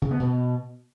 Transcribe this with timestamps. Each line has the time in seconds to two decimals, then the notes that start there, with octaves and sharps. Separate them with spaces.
0.02 C#3
0.11 B3
0.20 B2